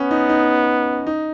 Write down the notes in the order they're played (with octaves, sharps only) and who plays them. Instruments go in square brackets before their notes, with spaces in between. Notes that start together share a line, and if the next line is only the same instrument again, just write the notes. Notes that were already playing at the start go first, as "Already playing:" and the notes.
Already playing: [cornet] B3 [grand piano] C#4
[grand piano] D#4
D#4
D#4